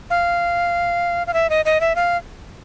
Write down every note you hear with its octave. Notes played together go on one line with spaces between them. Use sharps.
F5
F5
E5
D#5
D#5
E5
F5